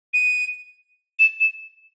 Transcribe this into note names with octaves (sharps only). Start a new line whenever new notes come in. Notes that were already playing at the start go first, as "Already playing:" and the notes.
D#7
E7
E7